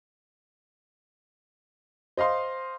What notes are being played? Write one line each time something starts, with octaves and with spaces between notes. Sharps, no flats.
C5 D#5 F5 C6